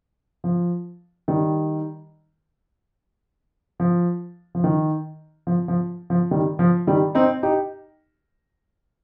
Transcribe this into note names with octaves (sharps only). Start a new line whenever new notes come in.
F3
D#3 G3
F3
F3
D#3
F3
F3
F3
D#3 G3
F3
D#3 G3
C4 D#4
D#4 G4